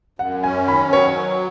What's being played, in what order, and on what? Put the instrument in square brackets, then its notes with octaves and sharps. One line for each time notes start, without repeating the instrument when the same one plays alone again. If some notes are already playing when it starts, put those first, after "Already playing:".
[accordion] F#2 [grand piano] F#5
[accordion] C#4 [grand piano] G#5
[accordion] D#3 [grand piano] B5
[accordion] F#3 [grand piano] C#5